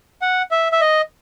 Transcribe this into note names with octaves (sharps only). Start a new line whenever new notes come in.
F#5
E5
E5
D#5